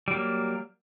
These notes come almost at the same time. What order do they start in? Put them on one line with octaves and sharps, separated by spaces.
G3 F#3 A#3